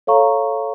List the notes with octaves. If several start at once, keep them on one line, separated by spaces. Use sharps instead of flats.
A4 C#5 F5 A#5 C#6